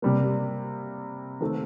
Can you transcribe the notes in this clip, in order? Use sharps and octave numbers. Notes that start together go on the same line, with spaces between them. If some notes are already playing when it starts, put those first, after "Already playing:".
C3 G3 A#3
D#3 A3 C4